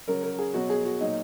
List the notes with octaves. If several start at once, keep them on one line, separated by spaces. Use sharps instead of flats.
C#3 F#3 A#4
A#4
G#4
B2 F#3 F#4
G#4
F#4
A#2 F#3 D#4